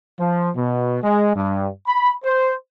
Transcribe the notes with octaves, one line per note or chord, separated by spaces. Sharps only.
F3
B2
G#3
G2
B5
C5